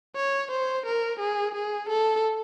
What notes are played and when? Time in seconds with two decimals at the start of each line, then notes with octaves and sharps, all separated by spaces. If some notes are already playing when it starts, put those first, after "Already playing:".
0.16 C#5
0.51 C5
0.86 A#4
1.20 G#4
1.55 G#4
1.89 A4